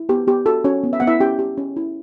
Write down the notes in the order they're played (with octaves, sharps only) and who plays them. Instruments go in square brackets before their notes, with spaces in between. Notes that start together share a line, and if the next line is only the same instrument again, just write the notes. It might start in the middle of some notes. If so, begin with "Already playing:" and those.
Already playing: [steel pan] E4
B3 G4
B3 G4
F#4 A4
C#4 F#4 C#5
B3
E5
B3 F#5
E4 E5
C#4 G4 G5
G4
C#4
E4